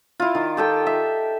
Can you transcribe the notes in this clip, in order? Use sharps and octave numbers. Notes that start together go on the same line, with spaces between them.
E4 F4
D#3
G4 A4 G5
E5